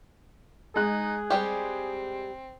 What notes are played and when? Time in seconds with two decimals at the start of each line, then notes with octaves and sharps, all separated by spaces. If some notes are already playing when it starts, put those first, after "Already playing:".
0.76 G#3 D#4 G#4 F#6
1.30 G3 C4 G4